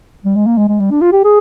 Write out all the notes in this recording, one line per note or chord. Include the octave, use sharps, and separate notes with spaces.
G3
G#3
A#3
G#3
G#3
G3
D4
F4
G4
G#4